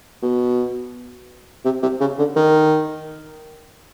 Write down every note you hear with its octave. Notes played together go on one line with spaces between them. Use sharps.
B2
C3
C3
C#3
D3
D#3